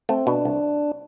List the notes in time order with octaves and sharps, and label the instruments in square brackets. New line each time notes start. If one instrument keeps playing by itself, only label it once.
[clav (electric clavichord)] A3 [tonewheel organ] C4
[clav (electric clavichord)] B2 [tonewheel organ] D4
[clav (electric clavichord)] C2